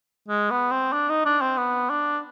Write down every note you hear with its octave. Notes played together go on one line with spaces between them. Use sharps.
G#3
B3
C4
D4
D#4
D4
C4
B3
D4